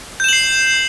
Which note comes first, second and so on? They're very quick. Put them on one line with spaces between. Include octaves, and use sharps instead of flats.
G6 E7 F#7 C7